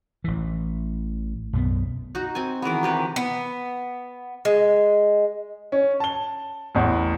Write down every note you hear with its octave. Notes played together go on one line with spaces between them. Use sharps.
A1 E3
B1 F#2 E3 B3
D#4 F#4
C4 G#5
D#3 E3 G#3 B3
C3 G4 B4
B3
G#3
C#4
A5 G7
A1 E2